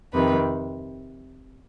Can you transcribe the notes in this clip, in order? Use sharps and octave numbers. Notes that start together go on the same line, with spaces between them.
F2 C3 D#3 B4